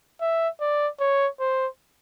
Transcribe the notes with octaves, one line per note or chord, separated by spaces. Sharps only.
E5
D5
C#5
C5